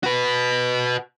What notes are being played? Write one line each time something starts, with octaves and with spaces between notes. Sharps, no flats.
F#4 B4